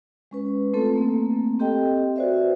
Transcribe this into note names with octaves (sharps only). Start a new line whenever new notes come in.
G#3 C#4 B4
A3 C4 F4 A4
A3 A#3 C4
C4 G4 A4 D#5 G5
F#4 B4 C5 D5 E5